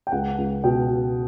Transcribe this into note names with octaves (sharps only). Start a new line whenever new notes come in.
G5
C#2 F#5
C#2
B2 G5